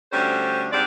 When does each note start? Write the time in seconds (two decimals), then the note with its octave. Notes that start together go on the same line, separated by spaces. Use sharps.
0.12 D2 G3 C#4 D4 A4 C5
0.72 G#2 G3 C4 D4 D5